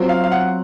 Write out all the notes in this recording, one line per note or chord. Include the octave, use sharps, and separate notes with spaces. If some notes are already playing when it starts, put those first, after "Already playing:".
Already playing: F#3 C4 F4
F5
F5
F#5